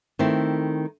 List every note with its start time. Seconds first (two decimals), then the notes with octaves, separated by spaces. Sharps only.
0.19 D#3 A3 C4 E4